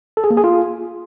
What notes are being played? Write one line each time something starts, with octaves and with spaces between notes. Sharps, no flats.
A4
G#4
A#3
G#4
F4